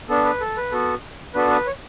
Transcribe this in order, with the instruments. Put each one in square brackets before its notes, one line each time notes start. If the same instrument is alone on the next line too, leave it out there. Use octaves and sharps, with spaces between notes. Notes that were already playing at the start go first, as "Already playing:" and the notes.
[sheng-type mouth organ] B3 D4 A4
B4
A4
B4
B3 F#4 A4
B3 D4 F#4 A4 B4
B4
C#5